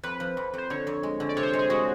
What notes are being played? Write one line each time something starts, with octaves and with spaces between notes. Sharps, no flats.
F2 B4
F3
F2
F2 C5
D3 C#5
F2
G#3
D3
D5
C3 C#5
C5
C#5
G#3
G#4
G#3 F#4